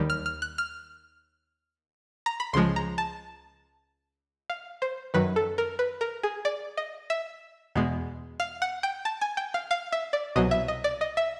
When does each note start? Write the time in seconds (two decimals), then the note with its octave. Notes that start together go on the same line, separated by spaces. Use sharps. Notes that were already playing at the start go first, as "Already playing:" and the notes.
Already playing: D#2 D#3 G3
0.10 F6
0.26 F6
0.42 F#6
0.58 F6
2.26 A#5
2.40 B5
2.53 C#2 C#3 F3 G#3 C6
2.76 A#5
2.98 A5
4.50 F5
4.82 C5
5.14 F#2 D#3 F#3 B4
5.36 A4
5.58 A#4
5.79 B4
6.01 A#4
6.23 G#4
6.45 D5
6.77 D#5
7.10 E5
7.75 E2 B2 G#3
8.40 F5
8.62 F#5
8.83 G5
9.05 A5
9.21 G#5
9.37 G5
9.54 F5
9.71 F5
9.92 E5
10.13 D5
10.36 C2 B2 F#3 D#5
10.51 E5
10.68 D#5
10.84 D5
11.01 D#5
11.17 E5